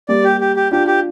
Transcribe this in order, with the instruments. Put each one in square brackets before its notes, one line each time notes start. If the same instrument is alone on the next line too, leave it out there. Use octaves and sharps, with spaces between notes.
[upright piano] G3 A#3 [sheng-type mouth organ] D5
[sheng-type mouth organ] G4
G4
G4
[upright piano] D4 F4 [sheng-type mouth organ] G4
[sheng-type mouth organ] G4